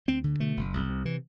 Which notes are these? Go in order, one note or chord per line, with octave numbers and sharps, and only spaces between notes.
D2 C4
D3
B2 A3
F#1
C2
C3
E3